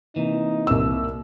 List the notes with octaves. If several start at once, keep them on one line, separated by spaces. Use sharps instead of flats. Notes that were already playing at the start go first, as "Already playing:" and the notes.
C3 E3 A#3 D#4
C2 E6